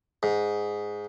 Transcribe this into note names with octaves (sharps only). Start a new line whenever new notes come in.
G#2